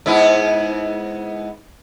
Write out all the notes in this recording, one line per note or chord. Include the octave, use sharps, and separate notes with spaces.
G#2 B3 E4